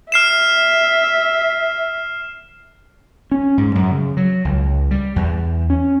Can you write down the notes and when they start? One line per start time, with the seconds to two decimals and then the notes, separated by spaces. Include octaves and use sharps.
0.12 E5 F6 C7 E7
3.32 C#4
3.58 G#2
3.75 F#2
3.91 C#3
4.17 F#3
4.45 C#2
4.91 G3
5.16 E2
5.70 C#4